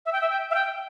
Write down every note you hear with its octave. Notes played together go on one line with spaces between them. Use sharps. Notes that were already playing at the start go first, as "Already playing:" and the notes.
E5
G5
E5
G5
E5
G5